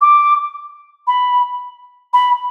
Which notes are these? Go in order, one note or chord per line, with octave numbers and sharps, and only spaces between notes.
D6
B5
B5